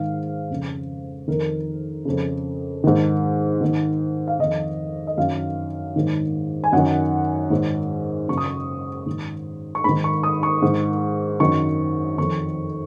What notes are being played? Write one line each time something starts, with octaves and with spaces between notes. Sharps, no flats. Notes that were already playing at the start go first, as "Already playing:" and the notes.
Already playing: G#2 D#3 F5
F2 C#3
F2 D#3 A#4
F2 C#3
G#2 D#3
G#2 D#3
F5
F2 D#3 D#5
D#5
F#2 D#3 F5
G#2 D#3
G#5
F#2 D#3 F#5
G#2 D#3
F#2 C#3 C#6
D#6
C#6
G#2 D#3
C#6
G#2 D#3 B5
C#6
D#6
C#6
G#2 D#3
F#2 D#3 C#6
F2 D#3 C#6